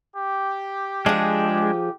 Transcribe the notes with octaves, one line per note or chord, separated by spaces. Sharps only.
G4
F3 G#3 D4 G#4